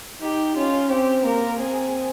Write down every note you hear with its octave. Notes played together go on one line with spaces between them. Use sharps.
D#4 G4
C#4 F4
C4 G4
A#3 A#4
C4 G#4